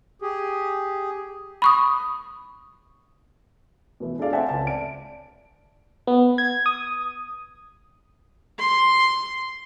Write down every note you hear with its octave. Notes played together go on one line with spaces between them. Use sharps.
G4 G#4
B5 C#6 D#6
B2 E3
D4 G#4 A4 D5 F5
C4 A4 E5 F#5 G#5 A5
C#2 G#5 A5
D5 D7
B3
G#6
D#6
C6